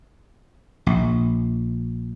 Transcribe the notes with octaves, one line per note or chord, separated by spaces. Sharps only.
A#1